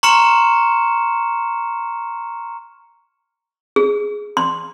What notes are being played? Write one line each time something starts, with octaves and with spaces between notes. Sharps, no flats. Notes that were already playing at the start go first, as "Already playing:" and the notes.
A#5 C6 C#6 F6 C#7 E7
G#4
C6